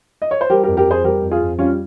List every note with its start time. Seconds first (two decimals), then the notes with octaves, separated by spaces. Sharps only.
0.22 D#5
0.31 C#5
0.41 C5
0.50 G3 G4 A#4
0.64 F2 G4 A#4
0.77 G4 A#4
0.86 F2 G#4 C5
1.04 G3 G4 A#4
1.22 F2
1.31 F4 G#4
1.40 F2
1.58 G3 C#4 F4